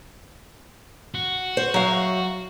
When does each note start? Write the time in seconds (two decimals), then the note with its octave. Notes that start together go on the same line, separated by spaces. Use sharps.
1.15 F#4
1.57 C5
1.74 F#3 E5 F5